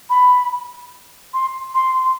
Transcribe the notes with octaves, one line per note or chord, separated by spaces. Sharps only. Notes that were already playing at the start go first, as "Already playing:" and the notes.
B5
C6
C6